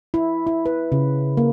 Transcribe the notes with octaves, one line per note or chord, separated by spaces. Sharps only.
E4
E4
B4
C#3
A#3